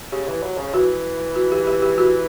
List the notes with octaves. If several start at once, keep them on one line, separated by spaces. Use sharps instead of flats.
C#3 G4
E3
F#3
C#3
E3 F#4
F#4
G4
G4
G4
F#4